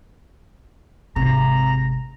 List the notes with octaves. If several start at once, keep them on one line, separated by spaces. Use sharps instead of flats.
G#1 C3 A#5